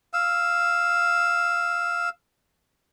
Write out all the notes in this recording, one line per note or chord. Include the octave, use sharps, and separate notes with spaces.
F5 E6